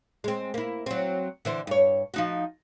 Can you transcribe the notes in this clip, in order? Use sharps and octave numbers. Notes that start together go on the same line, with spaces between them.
G#3 C4
A#3 E4
F#3 C4
D3 E3 C5
G2 C#5
F3 D#4 F#4